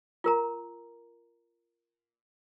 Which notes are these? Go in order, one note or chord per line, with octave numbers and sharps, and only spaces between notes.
F4 A#4 A#5